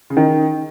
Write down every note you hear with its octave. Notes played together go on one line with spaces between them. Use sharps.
C#3
D#3